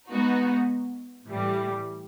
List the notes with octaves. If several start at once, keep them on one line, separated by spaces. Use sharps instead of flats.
G#3 B3 D#4 F#4
A2 E3 G3